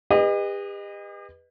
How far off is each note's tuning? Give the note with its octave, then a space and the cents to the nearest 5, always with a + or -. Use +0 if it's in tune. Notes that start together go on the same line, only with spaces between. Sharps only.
G4 +45 B4 +0 D#5 -20